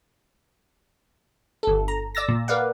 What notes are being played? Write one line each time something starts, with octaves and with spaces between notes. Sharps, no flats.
G1 A4
A#5
D5 E6 A6 A#6
A#2
A#4 B4 D5 F5 F#5